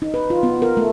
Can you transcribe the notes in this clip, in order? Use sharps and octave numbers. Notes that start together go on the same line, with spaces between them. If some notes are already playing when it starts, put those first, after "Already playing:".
D#4
B4
F4
B3
A#4
A3